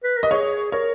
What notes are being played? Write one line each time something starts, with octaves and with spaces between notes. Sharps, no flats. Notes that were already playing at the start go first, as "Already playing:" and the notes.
B4
A#4
D#5
G#4 C#5
A#4 C#5